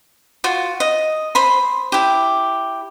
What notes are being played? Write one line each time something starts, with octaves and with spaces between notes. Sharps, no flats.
F4 F#4
D#5
C5 B5 C6
E4 G4